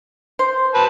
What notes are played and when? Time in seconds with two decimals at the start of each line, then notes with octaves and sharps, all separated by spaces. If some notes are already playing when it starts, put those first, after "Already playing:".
0.39 C5
0.75 B4 A5